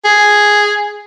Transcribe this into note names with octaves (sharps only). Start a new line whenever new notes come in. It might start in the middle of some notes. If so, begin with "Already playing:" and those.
G#4